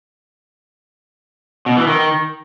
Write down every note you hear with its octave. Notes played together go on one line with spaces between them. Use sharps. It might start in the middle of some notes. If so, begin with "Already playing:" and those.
B2
E3
D#3